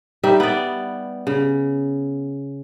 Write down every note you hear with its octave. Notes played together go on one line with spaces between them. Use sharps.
G3 D#4 E5
B3 D5
C#3